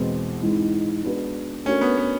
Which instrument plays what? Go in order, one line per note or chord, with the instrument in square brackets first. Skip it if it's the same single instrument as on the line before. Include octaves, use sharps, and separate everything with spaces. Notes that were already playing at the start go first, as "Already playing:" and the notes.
Already playing: [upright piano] E2 B2 G#3 C4 E4
G#2 E3 G#3 C4
G#3 B3 D4 F#4 B4
[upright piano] A3 D4 F#4 A#4 [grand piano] C#4
[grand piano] B3
B3